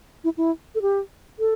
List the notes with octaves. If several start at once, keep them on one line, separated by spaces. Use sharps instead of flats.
E4
E4
A4
G4
A4